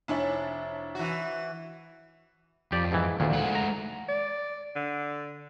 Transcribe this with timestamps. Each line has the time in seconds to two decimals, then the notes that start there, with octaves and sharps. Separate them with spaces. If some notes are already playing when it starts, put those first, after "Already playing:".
0.08 F1 D4 E4 C5 C#5 G#5
0.95 E3 F#4
2.72 F2 G4 D5
2.92 G#2 E3
3.20 D2 A#2 D#3
3.33 G#3 A3 F#5
3.55 A#5
4.09 D5
4.76 D3